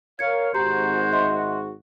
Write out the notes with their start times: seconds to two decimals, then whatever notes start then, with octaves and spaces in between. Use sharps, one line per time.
0.19 A#4 C#5 F5 G#6 C#7
0.54 G#1 G#2 F#4 G4 C5 A#5
1.12 D#5 E5 C6